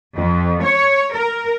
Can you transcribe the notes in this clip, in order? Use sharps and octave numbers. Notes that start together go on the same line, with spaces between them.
F2
C#5
A#4